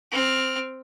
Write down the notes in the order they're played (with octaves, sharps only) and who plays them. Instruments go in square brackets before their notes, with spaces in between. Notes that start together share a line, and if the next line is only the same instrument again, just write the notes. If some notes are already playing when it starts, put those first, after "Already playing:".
[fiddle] C4 F6